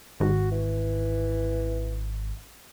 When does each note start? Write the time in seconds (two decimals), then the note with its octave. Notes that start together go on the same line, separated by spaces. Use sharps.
0.20 G#1 F#4
0.52 E3